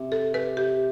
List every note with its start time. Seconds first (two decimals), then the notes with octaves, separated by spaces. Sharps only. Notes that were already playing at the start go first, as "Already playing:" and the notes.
Already playing: C3
0.12 A4
0.34 B4
0.57 G4